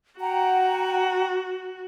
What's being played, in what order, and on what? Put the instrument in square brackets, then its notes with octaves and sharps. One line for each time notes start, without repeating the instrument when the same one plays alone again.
[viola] F#4 [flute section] F#5 G5 A#5